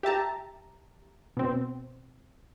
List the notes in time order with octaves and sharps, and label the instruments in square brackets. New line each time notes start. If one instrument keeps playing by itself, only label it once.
[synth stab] G4 E5 A5 A#5
B2 C4